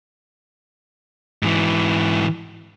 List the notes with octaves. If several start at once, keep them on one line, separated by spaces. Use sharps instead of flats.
G#2 E3